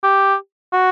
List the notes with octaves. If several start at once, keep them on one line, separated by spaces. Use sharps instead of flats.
G4
F#4